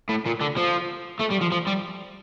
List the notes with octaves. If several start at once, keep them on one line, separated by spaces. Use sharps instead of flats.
A2
A#2
D3
F3
A3
G3
F3
F3
G3